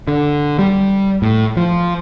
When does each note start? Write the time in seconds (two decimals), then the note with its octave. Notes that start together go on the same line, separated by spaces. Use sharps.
0.08 D3
0.59 G3
1.22 A2
1.57 F3